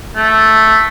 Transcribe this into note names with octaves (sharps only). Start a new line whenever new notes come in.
A3